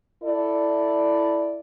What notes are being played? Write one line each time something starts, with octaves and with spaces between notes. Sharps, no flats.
E4 A4 D5